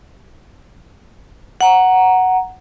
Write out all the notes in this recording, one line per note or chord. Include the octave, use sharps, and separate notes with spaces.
F#5 A#5